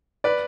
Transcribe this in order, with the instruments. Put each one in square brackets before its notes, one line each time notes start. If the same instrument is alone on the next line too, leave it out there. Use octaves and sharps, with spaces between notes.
[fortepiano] B4 D5